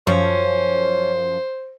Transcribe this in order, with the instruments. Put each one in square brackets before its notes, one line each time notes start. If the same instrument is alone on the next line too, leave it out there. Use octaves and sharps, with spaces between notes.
[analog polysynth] F#2 F3 [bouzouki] C#4 [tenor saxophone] C5